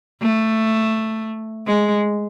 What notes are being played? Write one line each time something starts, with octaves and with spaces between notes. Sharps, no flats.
A3
G#3